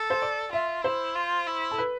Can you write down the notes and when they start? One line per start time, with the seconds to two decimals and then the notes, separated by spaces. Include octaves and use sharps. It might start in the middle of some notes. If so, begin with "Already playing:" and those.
Already playing: A4
0.10 C5
0.22 D5
0.53 F4 E5
0.84 E4 C5
1.15 F4
1.47 E4
1.71 A4
1.78 B4